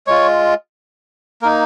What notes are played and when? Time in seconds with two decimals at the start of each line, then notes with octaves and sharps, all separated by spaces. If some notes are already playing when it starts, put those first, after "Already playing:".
0.07 G#3 F4 C#5
1.42 A#3 D#4 A#4